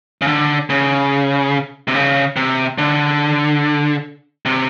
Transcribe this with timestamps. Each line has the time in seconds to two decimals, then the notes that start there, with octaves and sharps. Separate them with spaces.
0.22 C#3
0.28 D3
0.70 C#3
1.88 C3
1.95 C#3
2.36 C3
2.78 D3
4.45 C3